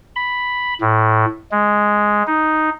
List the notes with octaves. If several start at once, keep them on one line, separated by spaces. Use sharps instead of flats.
B5
A2
G#3
D#4